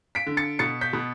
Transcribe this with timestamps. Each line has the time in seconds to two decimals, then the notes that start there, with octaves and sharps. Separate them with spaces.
0.15 B6 D7
0.26 D3
0.37 A6 C#7
0.59 B2 A6 C#7
0.81 G6 B6
0.93 B2